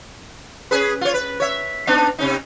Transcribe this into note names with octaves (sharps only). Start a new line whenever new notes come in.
C#4 G#4 B4
F4 C#5
B4
C#5 E5
B3 D4 D#4
C3 C#4 D#4